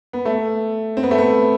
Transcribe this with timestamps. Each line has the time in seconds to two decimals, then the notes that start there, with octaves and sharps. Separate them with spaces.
0.13 B3
0.25 A3
0.97 C4
1.03 B3
1.11 A3
1.18 B3